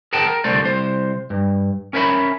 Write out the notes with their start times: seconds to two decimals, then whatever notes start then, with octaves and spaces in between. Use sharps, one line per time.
0.13 G#4 A#4 F#5 G5 A5
0.27 A#4
0.44 C2 D3 A3 C5 D5
0.62 C2 C5
1.30 G2
1.93 C#4 A#4 C#5 E5 B5